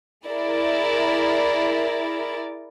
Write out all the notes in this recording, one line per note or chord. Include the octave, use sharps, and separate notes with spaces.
E4 G#4 A#4 D5